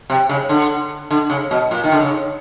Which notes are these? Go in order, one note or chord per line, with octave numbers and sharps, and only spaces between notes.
C3
C#3
D3
D3
C#3
B2
A#2
D#3
D3
C#3